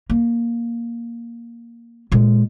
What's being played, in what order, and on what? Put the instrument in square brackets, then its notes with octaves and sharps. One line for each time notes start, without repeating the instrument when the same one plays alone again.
[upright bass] A#3
A#2 G#3